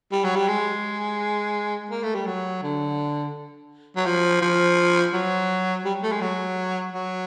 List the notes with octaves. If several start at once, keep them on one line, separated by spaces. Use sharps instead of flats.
G3
F#3
G3
G#3
A#3
A3
G3
F#3
D3
F#3
F3
F3
F#3
G3
A3
G#3
F#3
F#3